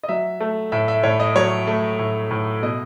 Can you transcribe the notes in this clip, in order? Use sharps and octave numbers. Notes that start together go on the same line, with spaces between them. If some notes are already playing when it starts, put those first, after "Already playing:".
D#5
F#3 E5
A3
A2 E5
E5
A2 C#5
D#5
F#3 C#5
A3
A2
A2
B2 D#5